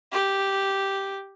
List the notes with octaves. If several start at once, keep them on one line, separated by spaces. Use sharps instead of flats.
G4